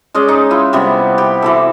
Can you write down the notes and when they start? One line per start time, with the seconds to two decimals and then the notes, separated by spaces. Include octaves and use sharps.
0.14 G#3 C#4 D5 D#5
0.28 D#4
0.51 E4 F4
0.73 C3 G3 B3
1.18 G4
1.42 E3 F#4 A4